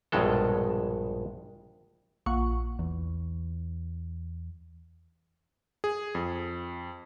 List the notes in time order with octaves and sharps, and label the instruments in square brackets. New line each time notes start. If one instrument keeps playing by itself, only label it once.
[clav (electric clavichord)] A#1 G2 B2 G#3 A4
[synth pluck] A#1 F#5 C#6
[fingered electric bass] E2
[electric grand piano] G#4
F2